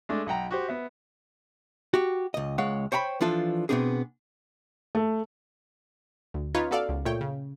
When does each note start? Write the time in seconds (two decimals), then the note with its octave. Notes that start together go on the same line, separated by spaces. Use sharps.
0.09 G#3 A3 D4
0.26 B1 F#5 G5 A#5
0.51 F#4 G4 C5
0.68 B3 E5
1.94 F#4 G4
2.34 C#2 D#5
2.58 C#2 G#3 C#5 F5 F#5
2.92 C5 C#5 G5 A#5 B5
3.21 E3 F3 D4 F4 A4
3.69 B2 F3 B3 C4 D4 G#4
4.95 A3
6.34 D2
6.55 C#4 D#4 F4 B4 C#5
6.71 B3 F#4 A4 D5 F5
6.89 C#2
7.06 A#2 A3 C#5 G5
7.21 C#3